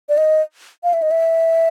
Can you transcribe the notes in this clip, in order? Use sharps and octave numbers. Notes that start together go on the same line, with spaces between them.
D5
D#5
F5
E5
D#5
E5